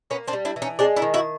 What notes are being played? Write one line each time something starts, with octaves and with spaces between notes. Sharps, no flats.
A#3 B3 C#4
C4 D4
G3
D4 E4
E3
C#4 D#4
G#3 C4 D4
D4 E4
D#3
E4 F#4